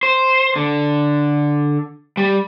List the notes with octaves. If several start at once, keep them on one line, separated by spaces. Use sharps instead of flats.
C5
D3
G3